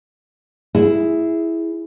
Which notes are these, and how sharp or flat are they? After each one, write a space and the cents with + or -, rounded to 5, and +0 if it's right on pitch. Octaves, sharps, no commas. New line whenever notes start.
E4 +0 G#4 +0